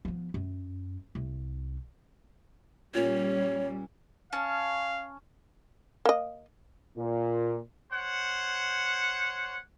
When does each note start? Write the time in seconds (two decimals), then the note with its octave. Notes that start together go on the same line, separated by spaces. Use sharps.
0.05 F3 B3
0.34 F#2
1.15 C2
2.95 A#2 G3 C#4 C#5
4.33 C#4 F5 A5
6.05 A#3 D#5
6.97 A#2
7.91 C5 C#5 F#5